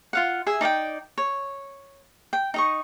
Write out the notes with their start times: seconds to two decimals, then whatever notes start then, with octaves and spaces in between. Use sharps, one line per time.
0.13 F4 F5 F#5
0.47 G#4 E5 G#5
0.61 D#4 D5 F5 G5
1.18 C#5
2.33 G5
2.54 D#4 D#5 C#6